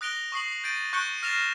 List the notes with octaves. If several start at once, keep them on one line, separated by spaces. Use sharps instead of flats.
D#6 F#6 A#6 D7 F7 G7
C#6 D#6 C7 F#7
G6 A6 D7 D#7
C#6 F#6 G6 C#7 D7 G7
F6 A6 A#6 C7 E7 F7